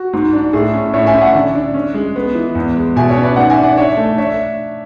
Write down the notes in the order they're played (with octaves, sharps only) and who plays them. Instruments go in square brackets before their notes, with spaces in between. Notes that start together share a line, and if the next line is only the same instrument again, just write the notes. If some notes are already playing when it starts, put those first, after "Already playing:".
Already playing: [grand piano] F#4
G#2
D4
A2 G#4
C#4
A2 C#5 E5
E5 G#5
C#4
D5 F#5
D3
D4
C#4
G#3
B3
E3
E2
G#3
B2 E5 G#5
C#5 E5
C#4
B4 D5
G#2 D5 F#5
E5 G#5
D4
D5 F#5
D4 C#5 E5
A3
D4 C#5 E5